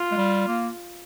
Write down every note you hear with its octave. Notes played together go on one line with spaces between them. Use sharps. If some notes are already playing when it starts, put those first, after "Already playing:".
Already playing: F4
G#3
G3
A#3